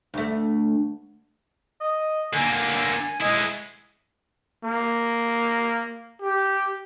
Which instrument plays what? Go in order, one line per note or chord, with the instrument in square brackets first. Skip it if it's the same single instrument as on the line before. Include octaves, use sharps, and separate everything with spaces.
[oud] D2 A3
[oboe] D#5
[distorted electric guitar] D3 A#3 [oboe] G#5
[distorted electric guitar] G#3 E4 [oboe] D#5
[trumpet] A#3
G4